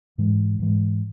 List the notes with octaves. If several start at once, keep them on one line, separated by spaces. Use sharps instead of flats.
G#2 E3 G#3
G#2 E3 G#3